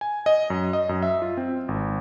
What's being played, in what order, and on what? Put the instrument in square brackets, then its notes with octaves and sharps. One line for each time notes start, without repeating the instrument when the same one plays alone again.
[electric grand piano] G#5
D#5
F#2
D#5
F#2
E5
F4
C4
G#1